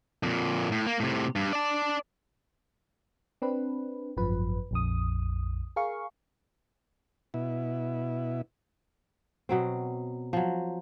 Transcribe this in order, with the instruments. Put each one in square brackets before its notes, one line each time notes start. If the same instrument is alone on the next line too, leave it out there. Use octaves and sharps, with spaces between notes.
[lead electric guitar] F2 A#2
A2
A#3
A2 C3
G2
D5 A5
[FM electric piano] C4 D4 B4
G#1 F#2 F3 B4
A#1 F2 D#6
G#4 A#4 F5 C#6
[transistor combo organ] B2 E4
[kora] B2 F#3 C4
F3 F#3